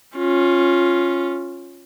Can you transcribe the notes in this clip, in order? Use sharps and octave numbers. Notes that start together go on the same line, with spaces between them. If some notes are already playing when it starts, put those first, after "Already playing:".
C#4 F4